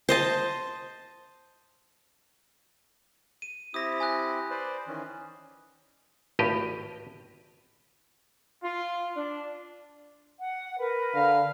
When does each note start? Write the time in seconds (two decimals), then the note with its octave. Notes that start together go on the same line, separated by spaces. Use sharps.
0.09 C5 D#5 A5
3.42 D#7
3.74 C4 E4 G4 D#6 A#6
4.00 G#5 D#6 F#6
4.50 B4 C5 D5
4.87 D#3 E3 C#4
6.39 G#1 C#2 A2 G4 D#5
8.64 F4
9.15 D4
10.40 F#5
10.78 A#4 B4
11.15 D3 F5